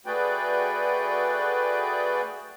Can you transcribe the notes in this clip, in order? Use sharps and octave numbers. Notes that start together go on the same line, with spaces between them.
A3 F#4 G#4 B4 D5 G5